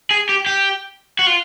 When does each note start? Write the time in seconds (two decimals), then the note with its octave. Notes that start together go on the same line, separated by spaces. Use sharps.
0.11 G#4
0.29 G4
0.46 G4
1.19 F#4
1.27 F4